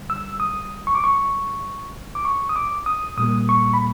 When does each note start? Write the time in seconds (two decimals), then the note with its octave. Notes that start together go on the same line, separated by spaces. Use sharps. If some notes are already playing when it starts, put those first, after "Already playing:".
Already playing: G2 D3 G3
0.10 E6
0.40 D#6
0.87 C#6
0.95 D6
1.04 C#6
2.15 D6
2.25 C#6
2.49 D#6
2.56 D6
2.86 D#6
3.17 A#2 G3 A#3 D#6
3.49 C#6
3.74 B5